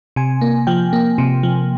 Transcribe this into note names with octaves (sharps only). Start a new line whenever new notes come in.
C3 G#5
A#3
F3 G5
A#3
C3
F3